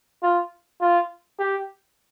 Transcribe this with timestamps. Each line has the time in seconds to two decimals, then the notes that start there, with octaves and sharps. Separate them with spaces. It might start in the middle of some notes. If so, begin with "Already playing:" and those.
0.23 F4
0.81 F4
1.39 G4